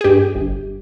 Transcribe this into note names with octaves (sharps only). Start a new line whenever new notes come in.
G#4
G2 G4
G1